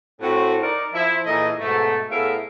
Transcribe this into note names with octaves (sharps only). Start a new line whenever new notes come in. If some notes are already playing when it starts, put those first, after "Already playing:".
A2 C4 F#4
D#4 A#4 D5
F3 E4
A#2 E3 D#4 G#4 A4 D#5
G#2 B2 A3
A2 B3 G#4 A#4 E5 F5